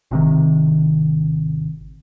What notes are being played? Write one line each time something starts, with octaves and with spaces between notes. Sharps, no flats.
G#1 C3 D#3